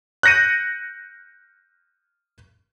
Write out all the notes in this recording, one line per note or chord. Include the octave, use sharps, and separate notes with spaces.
F#6 G6 A#6 C#7 D#7